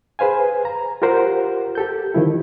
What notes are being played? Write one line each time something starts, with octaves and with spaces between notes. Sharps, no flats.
G#4 B4 C5 F5 G#5
A#5
F4 G4 A#4 C5 F#5
G4 A4 G6
D#3 F3 E4